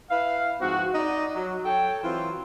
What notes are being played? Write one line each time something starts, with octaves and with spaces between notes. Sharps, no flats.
E4 B4 F5
G#2 F3 C4 F#4
D#4 D5 D#5
F#3
A4 C#5 G5
E3 F#3 C4 F4